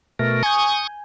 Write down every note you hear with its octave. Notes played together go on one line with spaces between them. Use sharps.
B2 A3 A#4
G#5 C#6 D#6 G6